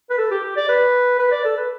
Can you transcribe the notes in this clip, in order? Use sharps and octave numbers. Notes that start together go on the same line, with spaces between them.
B4
A4
G4
G4
D5
B4
B4
D5
A4
B4